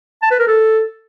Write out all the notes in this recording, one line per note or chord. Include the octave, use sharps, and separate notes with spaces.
A5
B4
A#4
A4